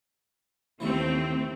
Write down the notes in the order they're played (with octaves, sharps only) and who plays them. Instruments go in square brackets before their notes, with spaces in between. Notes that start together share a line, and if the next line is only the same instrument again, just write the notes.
[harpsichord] D#2 C#3 E3 [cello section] A3 C4